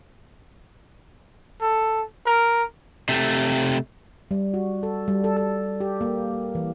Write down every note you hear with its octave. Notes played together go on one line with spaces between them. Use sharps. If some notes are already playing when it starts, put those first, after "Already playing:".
A4
A#4
C3 A3
G3
F#4
A4
G3
A4
A4
G4
A#3
E3